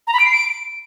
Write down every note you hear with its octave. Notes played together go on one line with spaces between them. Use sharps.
A#5
B5
D7
C7
D7